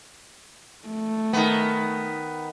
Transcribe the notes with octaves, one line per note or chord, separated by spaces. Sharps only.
A3
D#3 B3